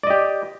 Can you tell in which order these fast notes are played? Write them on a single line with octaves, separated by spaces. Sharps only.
D5 D#5 G4